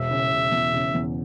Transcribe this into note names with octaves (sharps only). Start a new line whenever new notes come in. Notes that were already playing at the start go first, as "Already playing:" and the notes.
Already playing: E1 E5
C#3
E1
E2
C#3
E2